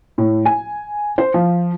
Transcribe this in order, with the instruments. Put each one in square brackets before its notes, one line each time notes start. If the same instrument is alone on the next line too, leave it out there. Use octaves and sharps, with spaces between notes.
[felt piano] A2
G#5
C5
F3